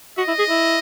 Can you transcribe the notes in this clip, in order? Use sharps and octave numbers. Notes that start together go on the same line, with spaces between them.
F#4 D#5
E4
G#4
E4